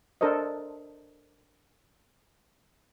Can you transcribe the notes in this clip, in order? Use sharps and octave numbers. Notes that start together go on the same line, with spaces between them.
D4 A4 A#4 C5 D#5